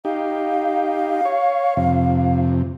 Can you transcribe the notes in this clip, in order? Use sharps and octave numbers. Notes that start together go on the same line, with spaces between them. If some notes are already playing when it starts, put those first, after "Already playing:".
D#4 G4 F5
C#5
F2 C3